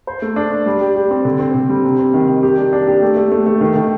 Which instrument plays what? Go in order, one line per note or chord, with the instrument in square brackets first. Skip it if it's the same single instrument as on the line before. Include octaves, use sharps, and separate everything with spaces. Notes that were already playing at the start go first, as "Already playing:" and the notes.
[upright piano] C5
A3
D4
D4
G3
G4
G4
C4
D3
C4
D3
G3
C3
C4
D#3
D#3
G4
D4
D4
G4
A3
A3
A3
A3
D#3
D#3